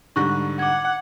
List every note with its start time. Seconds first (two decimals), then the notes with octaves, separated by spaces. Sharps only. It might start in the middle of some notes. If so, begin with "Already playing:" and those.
0.16 G#2 D3 G3 C#6 F#6 A#6
0.59 F#5 D6 G#6